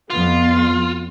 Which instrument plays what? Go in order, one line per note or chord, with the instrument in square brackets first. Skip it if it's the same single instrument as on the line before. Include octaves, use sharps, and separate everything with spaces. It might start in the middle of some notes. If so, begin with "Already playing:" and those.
[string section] F2 B3 [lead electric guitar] F4